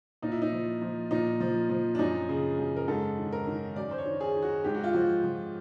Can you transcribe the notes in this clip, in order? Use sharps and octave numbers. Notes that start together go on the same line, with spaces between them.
A#2 D#4
E4
D#4
F3
F3
A#2 D#4
F3
F3
D4
F#2 D#4
C#3
F#2
A#4
G#2 A4
D#3
A#4
D#3
F#2 D5
C5
C#5
D#3
G#4
D#3
F#4
G#2 G4
F#4
F4
F3 F#4
F3